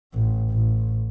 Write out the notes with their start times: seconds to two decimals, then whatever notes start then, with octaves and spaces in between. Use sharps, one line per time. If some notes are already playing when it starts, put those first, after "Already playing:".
0.14 A1
0.51 A1